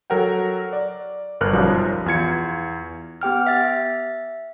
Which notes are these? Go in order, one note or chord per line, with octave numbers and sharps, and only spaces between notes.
F#3 A4 A#4 F#5 G5
D5
G1 A#4 F6 F#6
B1 F#2 F3 G3 A#4
E2 F4 G#6 C#7
B3 G4 G5 F6
E5 A6